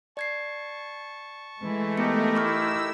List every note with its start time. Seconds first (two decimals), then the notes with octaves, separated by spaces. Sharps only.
0.17 D5 A5 C#6 G#6 C7
1.60 E3 G#3 A3
1.97 B3 D#4 G4 A4 A#4 C#7
2.36 E4 C#6 D6 E6 F6